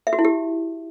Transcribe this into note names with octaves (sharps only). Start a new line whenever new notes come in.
E5
F#4
E4
G4